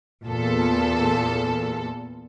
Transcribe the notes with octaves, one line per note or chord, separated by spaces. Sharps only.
E2 A#2 A4